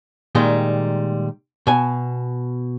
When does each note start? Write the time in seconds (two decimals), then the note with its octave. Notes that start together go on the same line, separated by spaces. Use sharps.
0.35 A#2 D#3 G3 G#3
1.67 B2 G#5